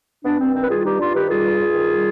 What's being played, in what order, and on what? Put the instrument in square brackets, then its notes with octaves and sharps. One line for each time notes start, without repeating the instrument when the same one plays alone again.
[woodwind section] G2 B3 D4
G2 C4
D#3 C4
B4
G3 F4 G#4
F4
G2 D#4 G4
G2 D4 F4
D#3 G4 B4
G3 F4 G#4
G2
G2
D#3
G3